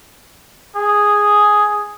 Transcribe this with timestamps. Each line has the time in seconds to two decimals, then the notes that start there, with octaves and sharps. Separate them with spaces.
0.76 G#4